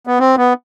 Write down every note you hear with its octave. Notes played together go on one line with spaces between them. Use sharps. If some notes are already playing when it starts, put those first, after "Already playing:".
B3
C4
B3